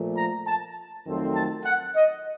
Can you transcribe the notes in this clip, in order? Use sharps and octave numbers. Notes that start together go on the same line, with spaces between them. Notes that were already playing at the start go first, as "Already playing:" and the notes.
Already playing: A#2 F3 A3
A#5
A5
F2 D#3 F#3 A3 C4
A5
F#5
D#5